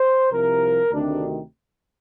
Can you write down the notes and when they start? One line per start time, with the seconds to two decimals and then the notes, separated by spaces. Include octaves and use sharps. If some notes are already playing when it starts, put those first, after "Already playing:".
Already playing: C5
0.32 C2 C3 F3 A#4
0.91 D2 C3 D#3 D4